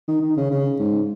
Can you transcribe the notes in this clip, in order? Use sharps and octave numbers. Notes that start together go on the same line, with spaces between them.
D#3
D#3
C#3
C#3
G#2